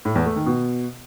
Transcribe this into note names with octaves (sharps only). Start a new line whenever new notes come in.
A2
E2
A3
D#3
B2